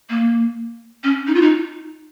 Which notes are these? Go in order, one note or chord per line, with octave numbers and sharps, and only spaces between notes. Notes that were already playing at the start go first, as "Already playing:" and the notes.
A#3
C#4
D#4
F4
D#4